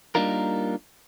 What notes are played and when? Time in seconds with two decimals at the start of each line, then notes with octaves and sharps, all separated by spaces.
0.15 G3 A#3 D4 D#4 F4 A#4